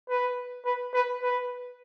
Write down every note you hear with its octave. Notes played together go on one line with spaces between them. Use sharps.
B4
B4
B4
B4